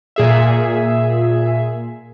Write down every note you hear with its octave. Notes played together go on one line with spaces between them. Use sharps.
A#2 G#4 E5